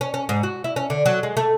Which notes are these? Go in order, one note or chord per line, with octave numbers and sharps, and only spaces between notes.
C#4
C#4
G#2
F#4
E4
C#4
D3
F#3
G#3
A3